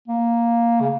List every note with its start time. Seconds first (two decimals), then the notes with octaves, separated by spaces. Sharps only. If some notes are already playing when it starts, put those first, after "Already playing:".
0.08 A#3
0.81 C#3